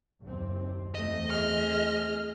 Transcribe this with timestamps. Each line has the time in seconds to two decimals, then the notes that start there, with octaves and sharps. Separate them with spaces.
0.22 F#1 D#2 C4
0.95 E2 A3 C4 D#5
1.30 G#4 F6